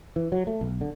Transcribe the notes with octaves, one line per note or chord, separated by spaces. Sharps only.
E3
F#3
A3
B1
D3